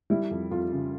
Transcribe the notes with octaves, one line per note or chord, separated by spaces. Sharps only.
G3 E4
F2
F2 F4
C#3